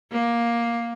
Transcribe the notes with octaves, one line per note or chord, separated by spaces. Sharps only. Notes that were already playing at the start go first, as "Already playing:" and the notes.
A#3